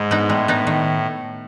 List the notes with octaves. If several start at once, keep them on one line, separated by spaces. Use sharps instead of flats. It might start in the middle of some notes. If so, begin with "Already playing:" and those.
Already playing: G#2 G#3
B3 D#4
A2 G#3
B3 D#4
D#3